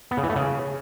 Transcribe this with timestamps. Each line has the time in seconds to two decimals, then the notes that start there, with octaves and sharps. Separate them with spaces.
0.11 B3
0.17 C#3
0.23 E3
0.30 A3
0.36 C#3